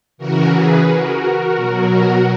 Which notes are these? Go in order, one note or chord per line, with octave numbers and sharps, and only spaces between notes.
C#3 E3 F#4 A#4
G#4 B4
F#4 A#4
B2 F#3